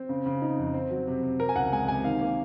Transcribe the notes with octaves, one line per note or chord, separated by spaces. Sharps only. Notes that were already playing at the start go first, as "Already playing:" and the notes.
Already playing: C4
C#3
C#3
D#4
F2
C4
F#3
C3
C3
C3 A#4
G#5
C#2 F#5
G#3 G#5
C3 G#5
D#3 F5
A#3